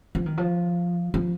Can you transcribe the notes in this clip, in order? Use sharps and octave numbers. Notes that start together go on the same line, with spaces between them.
F3
D#3
F3
F3